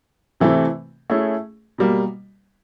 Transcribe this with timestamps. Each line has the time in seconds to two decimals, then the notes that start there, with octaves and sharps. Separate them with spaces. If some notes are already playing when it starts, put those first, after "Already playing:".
0.40 C3 E3 A3 C4 E4
1.10 A3 C#4 E4 G#4
1.78 B2 G3 A#3